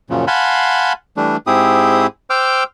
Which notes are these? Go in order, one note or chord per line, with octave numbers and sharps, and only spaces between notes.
F#2 A#2 C#3 F3
F5 F#5 G#5 A5 B5 C6
E3 G3 A3 D4
G#2 C4 E4 G4 G#4 D#6
C5 G5 D6 E6 F6